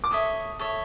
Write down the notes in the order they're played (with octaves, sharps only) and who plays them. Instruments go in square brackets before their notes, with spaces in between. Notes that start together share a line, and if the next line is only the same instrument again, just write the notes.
[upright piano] D6
[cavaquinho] A4 C#5 E5 [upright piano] D#6
[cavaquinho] A4 C#5 E5